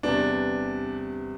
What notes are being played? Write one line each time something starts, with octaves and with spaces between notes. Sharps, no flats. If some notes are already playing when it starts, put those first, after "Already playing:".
E2 C3 G3 B3 D4